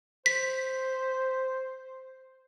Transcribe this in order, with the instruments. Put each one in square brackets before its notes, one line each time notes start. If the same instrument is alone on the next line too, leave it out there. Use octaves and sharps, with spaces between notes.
[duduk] C5 [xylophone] B6